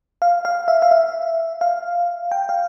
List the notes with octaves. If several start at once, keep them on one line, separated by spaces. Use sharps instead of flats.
F5
F5
E5
F5
E5
F5
G5
F5